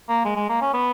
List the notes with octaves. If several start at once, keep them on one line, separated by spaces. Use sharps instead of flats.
A#3
G#3
G#3
A#3
C#4
B3